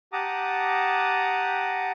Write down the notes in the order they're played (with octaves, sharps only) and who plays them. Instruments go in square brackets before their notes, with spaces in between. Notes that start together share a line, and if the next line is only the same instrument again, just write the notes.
[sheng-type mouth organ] G4 F#5 A5 A#5 D6 D#6